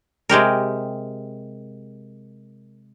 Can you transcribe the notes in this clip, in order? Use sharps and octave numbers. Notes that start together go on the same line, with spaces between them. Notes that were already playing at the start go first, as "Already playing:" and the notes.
C3 G#3 G4 A#4